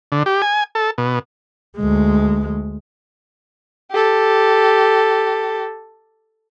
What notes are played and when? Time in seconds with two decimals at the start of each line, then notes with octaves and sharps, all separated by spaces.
0.12 D3
0.26 G4
0.42 G#5
0.75 A4
0.98 B2
1.76 D2 G#3
3.92 G4 A4